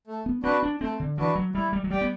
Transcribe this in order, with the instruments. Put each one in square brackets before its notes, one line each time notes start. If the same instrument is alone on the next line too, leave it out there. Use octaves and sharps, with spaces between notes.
[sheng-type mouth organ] A3
[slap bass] B3
[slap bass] C4 [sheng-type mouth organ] D4 F#4 B4
[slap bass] D4
[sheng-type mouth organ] A3 [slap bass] C4
[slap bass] D3
[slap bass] E3 [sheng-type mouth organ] D4 F#4 B4
[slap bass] F#3
[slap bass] G3 [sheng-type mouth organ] E4
[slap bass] G3
F#3
[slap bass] G3 [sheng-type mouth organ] G4 D5 G5
[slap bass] B3